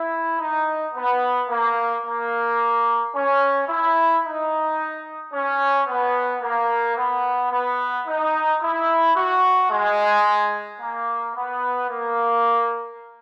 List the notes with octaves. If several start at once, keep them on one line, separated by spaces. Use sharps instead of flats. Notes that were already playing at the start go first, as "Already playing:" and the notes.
Already playing: E4
D#4
B3
A#3
A#3
C#4
E4
D#4
C#4
B3
A#3
B3
B3
D#4
E4
F#4
G#3
A#3
B3
A#3